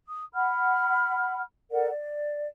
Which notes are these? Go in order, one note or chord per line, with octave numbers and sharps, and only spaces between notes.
D#6
F#5 B5 F6
A4 A#4 D5 F#5
D5